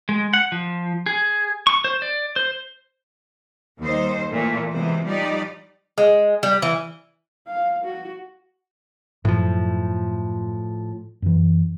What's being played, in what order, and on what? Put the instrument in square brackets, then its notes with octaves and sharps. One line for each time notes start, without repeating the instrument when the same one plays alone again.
[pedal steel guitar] G#3
F#5
F3
G#4
C#6
C5
D5
C5
[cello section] D#2 G3 D#4 C5
A#2 E3 A3
C3 E3 G#3 B3 C5
F3 G3 D#4 G4 D5
[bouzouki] G#3
G3
E3
[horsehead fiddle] F5
F#4
[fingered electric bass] F#2 [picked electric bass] A2 F3
[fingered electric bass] F#2 E3